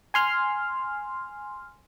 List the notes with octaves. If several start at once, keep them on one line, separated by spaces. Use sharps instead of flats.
G#5 C6 F6